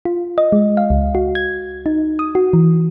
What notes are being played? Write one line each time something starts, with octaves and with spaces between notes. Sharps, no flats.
F4
D#5
G#3
F5
C#2
F#4
G#6
D#4
D#6
F#4
E3